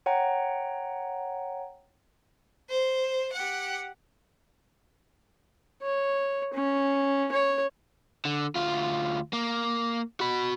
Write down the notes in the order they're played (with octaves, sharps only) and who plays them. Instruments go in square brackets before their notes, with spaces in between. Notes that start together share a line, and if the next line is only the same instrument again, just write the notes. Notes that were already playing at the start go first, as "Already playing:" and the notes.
[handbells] C#5 F#5 G5 A#5
[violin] C5
G4 F#5
[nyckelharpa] C#5
C#4
C#5
[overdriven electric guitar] D3
D2 F4
A#3
F#4 B5